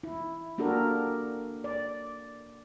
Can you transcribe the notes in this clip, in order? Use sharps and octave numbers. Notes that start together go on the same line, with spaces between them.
E4
A#3 D4 F#4 G4 A4 A#4
D5